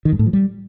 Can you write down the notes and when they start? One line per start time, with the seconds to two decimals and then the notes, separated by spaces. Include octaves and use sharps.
0.05 D#3
0.12 G2
0.19 A2
0.26 F3
0.33 G3